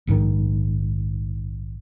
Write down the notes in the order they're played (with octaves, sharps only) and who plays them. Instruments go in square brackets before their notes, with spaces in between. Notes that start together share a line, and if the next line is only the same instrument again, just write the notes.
[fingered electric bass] A#1 G#2 D3 D#3